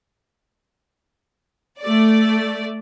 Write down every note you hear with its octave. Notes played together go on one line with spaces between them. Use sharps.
A3 D5